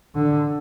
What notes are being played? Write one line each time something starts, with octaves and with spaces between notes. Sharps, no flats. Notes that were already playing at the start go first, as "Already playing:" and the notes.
D3